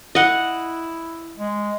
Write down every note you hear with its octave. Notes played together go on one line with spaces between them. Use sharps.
E4 D#5 F#5
G#3